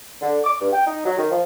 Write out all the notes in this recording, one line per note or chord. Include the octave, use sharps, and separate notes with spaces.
D3
D6
G2
G5
D#4
F#3
D#3
F3